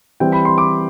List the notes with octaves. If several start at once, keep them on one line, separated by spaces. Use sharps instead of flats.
E3 G3 C4 G5
B5
C6
D6